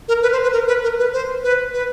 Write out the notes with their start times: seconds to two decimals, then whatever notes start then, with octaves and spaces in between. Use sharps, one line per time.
0.08 A#4
0.22 B4
0.32 C5
0.42 B4
0.53 A#4
0.68 B4
0.83 A#4
0.98 B4
1.13 C5
1.43 B4
1.73 B4